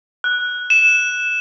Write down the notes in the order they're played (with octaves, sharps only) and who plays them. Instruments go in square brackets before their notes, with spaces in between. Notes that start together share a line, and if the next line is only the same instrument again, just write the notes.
[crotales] F#6
E7